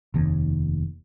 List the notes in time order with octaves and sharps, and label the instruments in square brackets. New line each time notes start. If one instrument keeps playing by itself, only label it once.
[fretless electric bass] F1 D#2